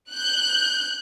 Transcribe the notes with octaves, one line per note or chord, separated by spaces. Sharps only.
F#6 G6